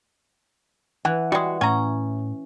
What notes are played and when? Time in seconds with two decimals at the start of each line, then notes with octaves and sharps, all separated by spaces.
1.05 E3 F#5
1.32 G3 G#3 F#4
1.61 A2 C#4 G#5 A#5